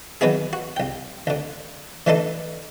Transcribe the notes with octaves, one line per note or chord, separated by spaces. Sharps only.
D#3 F#3 B3 E4 G#4
F#4
C2 G5
D2 D3
D3 E3 A3 D4 D#4 A4